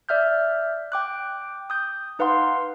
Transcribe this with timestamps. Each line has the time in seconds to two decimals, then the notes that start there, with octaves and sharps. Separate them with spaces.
0.09 D5 E5 F6 G6
0.92 G5 D6 F#6
1.70 D#6 G6
2.19 D#4 B4 F5 F#5 C6